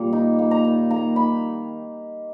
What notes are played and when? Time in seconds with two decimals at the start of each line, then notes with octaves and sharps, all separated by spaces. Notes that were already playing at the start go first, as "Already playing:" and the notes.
Already playing: A#2 G3 A#3
0.13 D#4
0.39 A#3
0.51 A#5
0.65 D#3
0.90 A#3 A#5
1.16 D#3 B5